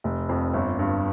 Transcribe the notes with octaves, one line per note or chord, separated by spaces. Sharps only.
F1
F2
G1
G2